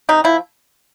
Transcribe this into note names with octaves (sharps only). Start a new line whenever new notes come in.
C3 D#4
F3 E4